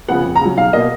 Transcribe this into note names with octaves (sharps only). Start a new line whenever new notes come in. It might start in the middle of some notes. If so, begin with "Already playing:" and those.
C#3 F3 B3 F#5
F2
A#5
C#3 F#3
B1 F5
B2 A#3 D#5